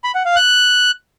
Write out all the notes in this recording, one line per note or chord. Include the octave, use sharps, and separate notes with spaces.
B5
F#5
F5
F#6